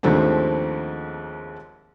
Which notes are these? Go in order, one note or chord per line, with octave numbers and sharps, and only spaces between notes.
D#2 G#2 F3 A3 C4 D4